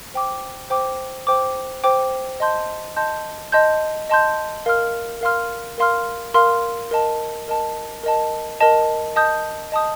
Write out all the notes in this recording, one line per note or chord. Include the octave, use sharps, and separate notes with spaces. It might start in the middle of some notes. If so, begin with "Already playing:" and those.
C5 G5 D6
C5 G5 D6
C5 G5 D6
C5 G5 D6
D#5 A5 C6 G6
D#5 A5 C6 G6
D#5 A5 C6 G6
D#5 A5 C6 G6
A#4 F5 C6 F6
A#4 F5 C6 F6
A#4 F5 C6 F6
A#4 F5 C6 F6
A#4 D#5 A5
A#4 D#5 A5
A#4 D#5 A5
A#4 D#5 A5
D#5 A5 D#6 G6
D#5 A5 D#6 G6